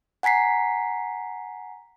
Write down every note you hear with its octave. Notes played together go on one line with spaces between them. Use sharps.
F#5 G#5 A#5 B6 C7